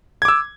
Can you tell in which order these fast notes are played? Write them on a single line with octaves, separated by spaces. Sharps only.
G#6 D6 E6